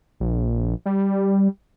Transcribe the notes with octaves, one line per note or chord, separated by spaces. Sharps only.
A#1
G3